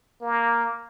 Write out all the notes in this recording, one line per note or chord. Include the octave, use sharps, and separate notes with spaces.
A#3